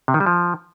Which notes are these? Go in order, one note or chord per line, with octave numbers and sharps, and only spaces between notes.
C3
D#3
G3
F3